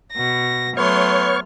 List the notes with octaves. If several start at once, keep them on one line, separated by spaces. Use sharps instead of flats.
B2 A#6
F#3 A3 B3 C#5 C6 C#6 F6